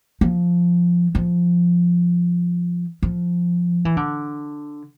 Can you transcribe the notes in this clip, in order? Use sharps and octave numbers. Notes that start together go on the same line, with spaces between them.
F3
F3
F3
E3
D3